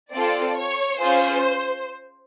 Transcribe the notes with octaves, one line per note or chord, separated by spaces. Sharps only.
C4 F4 A4 D5
C#5
C#4 F4 G#4 C5